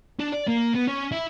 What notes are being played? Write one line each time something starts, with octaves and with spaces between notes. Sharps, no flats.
D4
D5
A#3
B3
C#4
E4